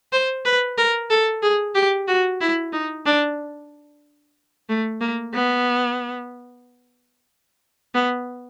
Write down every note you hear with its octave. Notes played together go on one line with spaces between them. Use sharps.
C5
B4
A#4
A4
G#4
G4
F#4
E4
D#4
D4
A3
A#3
B3
B3